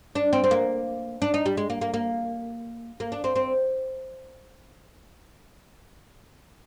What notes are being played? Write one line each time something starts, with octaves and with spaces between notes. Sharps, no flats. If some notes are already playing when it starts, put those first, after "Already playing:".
D4
C4
C4
A#3
D4
D#4
G3
G#3
A#3
A#3
A#3
A#3
D4
C4
C4